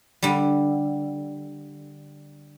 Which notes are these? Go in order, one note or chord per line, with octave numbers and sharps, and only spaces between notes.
D3 G3